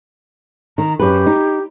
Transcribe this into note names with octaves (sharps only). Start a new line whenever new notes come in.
D#3 A#5
F#2 G4 B4
D#4